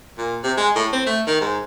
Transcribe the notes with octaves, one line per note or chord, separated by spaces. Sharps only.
A#2
C3
G#3
A2
C4
A3
D#3
G#2